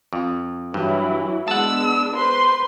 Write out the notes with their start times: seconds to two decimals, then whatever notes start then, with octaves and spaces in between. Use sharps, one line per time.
0.13 F2
0.74 G2 E3 F#3 E4
1.48 G#3 B3 D4 F#5 A5 E6
2.14 B4 C5 C6